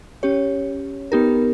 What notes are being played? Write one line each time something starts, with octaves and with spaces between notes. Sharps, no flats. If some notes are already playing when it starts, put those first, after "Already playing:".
C#4 G4 C#5
B3 D#4 G4 A#4